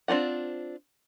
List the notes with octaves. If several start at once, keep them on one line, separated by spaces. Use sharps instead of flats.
C4 D4 F4 F#5